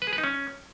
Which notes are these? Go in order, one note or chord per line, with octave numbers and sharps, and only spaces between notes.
B4
G#4
B4
D#4
C#4